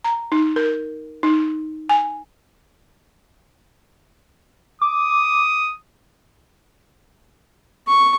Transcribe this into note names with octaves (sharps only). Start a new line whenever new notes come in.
A#5
D#4
A#4
D#4
G#5
D6 D#6
C#6